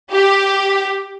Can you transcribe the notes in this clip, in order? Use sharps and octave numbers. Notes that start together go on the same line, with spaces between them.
G4